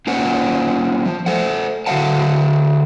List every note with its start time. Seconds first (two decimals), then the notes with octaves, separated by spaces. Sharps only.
0.07 A#3 C#4 F4 C5 F#5
1.06 F3
1.26 A4 C5 F#5
1.86 D3 F#4 A4 F5 F#5 A5